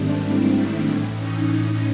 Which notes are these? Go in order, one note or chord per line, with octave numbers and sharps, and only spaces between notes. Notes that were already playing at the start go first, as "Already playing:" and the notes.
Already playing: G#2 D#3 G3 A3 C4 D4
D4 E4
A2 E3
C#4 D#4